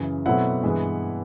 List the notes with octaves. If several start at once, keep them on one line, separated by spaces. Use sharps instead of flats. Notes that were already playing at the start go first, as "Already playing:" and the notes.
Already playing: F#2 C#3 E3
B2 F#3 A3 C4 E4 F#5
G2 E3 G#3 B3